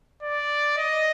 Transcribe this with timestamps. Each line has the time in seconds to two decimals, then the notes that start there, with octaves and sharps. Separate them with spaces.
0.23 D5
0.78 D#5